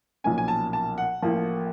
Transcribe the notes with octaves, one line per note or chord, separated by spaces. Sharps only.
B1 A#2 F3 A#3 C#4 G#5
G#5
A5
A5
F#5
A1 A2 F3 A#3